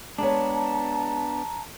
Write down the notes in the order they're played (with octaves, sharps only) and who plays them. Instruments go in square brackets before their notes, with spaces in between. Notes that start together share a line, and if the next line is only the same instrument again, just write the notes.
[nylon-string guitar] G#3 G#4 C#5 [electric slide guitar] B3 D4 [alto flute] A5 [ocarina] A#5